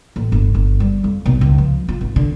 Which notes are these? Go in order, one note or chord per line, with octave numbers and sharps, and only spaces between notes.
A1
G1
G1
G3
F2
B1
C#2
F3
F4
G#1
D3